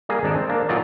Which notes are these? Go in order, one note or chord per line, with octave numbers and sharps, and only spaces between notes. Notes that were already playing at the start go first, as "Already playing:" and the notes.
G3 A#3 G#4
G#1 D4 D#4 D5 A5
C4
A#3 D4
A#2 F#3 D#4 F4 D5